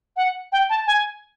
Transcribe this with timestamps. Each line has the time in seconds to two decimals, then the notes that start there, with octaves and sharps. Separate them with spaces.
0.17 F#5
0.52 G5
0.70 A5
0.87 G#5